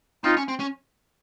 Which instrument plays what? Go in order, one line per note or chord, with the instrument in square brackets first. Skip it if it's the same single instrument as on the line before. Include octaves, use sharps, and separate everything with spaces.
[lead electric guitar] C4 [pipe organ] D#4 F4
[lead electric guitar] C#4
C4
C#4